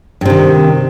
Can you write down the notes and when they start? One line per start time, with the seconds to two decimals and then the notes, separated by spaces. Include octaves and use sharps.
0.21 G2
0.25 C3
0.30 D#3